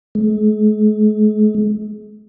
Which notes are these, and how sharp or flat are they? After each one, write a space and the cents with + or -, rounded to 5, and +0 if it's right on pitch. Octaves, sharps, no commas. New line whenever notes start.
G#3 +40